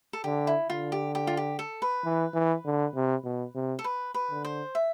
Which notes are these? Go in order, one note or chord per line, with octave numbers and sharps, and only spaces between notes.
A4
D3 G4
E4
D3 F4
G4
G4
F4
G4
A4
B4
E3
E3
D3
C3
B2
C3
A4
B4
B4
D3
C5
E5